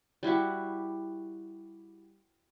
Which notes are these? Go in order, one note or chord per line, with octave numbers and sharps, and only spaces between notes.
G3 E4 F#4 G4